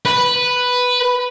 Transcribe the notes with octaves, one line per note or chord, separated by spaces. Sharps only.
B4